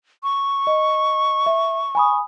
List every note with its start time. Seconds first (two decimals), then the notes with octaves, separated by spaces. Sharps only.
0.23 C#6
0.67 D#5
1.46 E5
1.95 G#5 B5 D#6